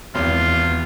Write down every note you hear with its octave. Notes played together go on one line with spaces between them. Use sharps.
G#1 E2 F4 D6